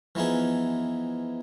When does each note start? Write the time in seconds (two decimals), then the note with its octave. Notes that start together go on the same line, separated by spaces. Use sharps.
0.15 E3 F3 B3 D#4 G#4